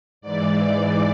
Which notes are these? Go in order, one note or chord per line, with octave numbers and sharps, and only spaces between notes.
G#2 E3 D5